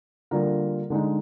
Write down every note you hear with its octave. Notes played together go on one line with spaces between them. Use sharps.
D3 G3 A#3 F4 A#4
D3 G#3 D#4